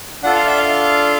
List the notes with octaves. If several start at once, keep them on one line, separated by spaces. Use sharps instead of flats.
D4 F4 A4 F#5
F5
E5
F5